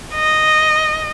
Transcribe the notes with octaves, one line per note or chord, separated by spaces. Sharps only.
D#5